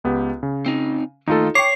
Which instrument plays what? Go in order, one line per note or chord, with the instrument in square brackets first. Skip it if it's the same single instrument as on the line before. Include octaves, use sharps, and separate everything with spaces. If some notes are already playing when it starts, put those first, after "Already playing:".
[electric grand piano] C#2 B3 G4
C#3
[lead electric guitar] C4 D#4
[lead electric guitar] D#2 A3 [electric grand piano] D#4 F4 A4
[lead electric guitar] C#5 [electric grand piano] G5 C#6 D6 [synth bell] C7